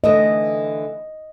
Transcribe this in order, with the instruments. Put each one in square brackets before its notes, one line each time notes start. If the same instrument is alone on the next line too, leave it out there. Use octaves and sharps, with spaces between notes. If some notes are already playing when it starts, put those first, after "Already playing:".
[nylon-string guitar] D3 E3 A3 [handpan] D#5